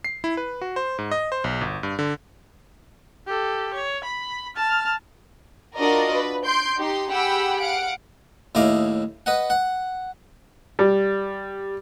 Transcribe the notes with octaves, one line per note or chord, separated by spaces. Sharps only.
C7
E4
B4
F#4
C5
G#2
D#5
C5
B1
G1
G2
D3
G4 A4
C#5
B5
A5 F6
D4 F4 F#4 A#4 D5 D#5
B4
C6 G6 D7
D#4 G4 C6
G4 G#4 F#5 G5 B5 E6
F5 F#5 D7
D#2 A2 E4 D#5 F5 D6
B4 D#5 F#5
F#5
G3